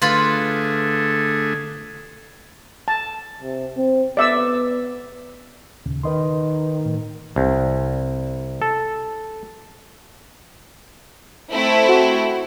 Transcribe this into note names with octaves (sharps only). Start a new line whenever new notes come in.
D3 A3 F4 G#4 B4 B5
A5
C3
C4
B3 D5 E5 E6
D#2 A#2 C#3
D#3 B4 D#5 C6
A2
C2
A4
A3 C4 E4
F#4